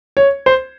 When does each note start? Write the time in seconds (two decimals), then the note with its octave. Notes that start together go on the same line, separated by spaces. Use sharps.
0.17 C#5
0.46 C5